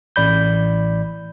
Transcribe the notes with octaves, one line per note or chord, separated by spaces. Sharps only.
A1 D5 B5 G6